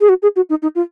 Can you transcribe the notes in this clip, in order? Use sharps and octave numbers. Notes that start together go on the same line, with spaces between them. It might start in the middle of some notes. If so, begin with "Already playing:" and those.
G#4
F#4
G#4
F#4
D#4
D#4
F4